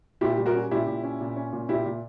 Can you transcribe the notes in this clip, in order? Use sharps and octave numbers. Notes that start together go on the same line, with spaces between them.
A#2 E4 G4
G3
F#4 A#4
C#4
A#2 E4 G4
A#2
C#4
A#2
C#4
A#2
A#2 E4 G4
A#2